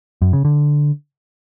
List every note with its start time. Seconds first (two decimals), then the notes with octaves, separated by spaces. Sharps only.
0.22 F#2
0.33 C#3
0.45 D3